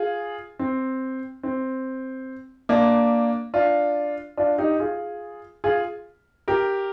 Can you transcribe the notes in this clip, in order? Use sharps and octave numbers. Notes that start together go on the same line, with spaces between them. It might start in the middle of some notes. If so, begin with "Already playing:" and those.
Already playing: F4 G#4
C4
C4
A#3 D4
D4 F4
D4 F4
D#4 G4
F4 G#4
F4 G#4
G4 A#4